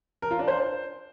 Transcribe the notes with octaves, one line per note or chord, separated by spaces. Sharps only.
A#4
F4
D4
C5